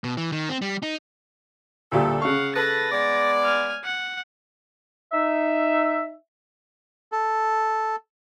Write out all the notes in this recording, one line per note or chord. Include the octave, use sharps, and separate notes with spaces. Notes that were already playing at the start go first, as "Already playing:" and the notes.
B2
E3
D#3
C4
G3
D#4
D2 A#2 G3 A3 D4 A4
C#3 F5 F#5 C#6
A4 B4 A6 A#6
G#3 B3 D5
G#5 F6
F#5
D#4 E5
A4